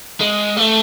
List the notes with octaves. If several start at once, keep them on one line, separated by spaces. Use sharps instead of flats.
G#3
A3